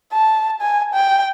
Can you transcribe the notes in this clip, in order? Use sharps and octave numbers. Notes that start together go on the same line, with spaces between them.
A5
G#5
G5